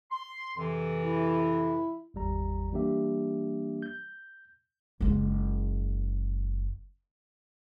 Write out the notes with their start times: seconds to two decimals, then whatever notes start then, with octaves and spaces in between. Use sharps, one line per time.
0.11 C6
0.57 F2 C3 E3
1.05 E4
2.14 G#1 E2 G3 A#5
2.72 E3 G3 A#3 D4 G4 E5
3.82 G6
5.01 F#1 G#3